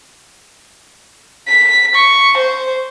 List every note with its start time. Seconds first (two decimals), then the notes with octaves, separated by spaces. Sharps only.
1.48 B6
1.95 C#6
2.37 C5